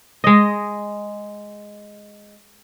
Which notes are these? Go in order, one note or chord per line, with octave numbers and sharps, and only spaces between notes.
G#3 D#5